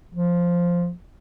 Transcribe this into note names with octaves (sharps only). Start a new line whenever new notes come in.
F3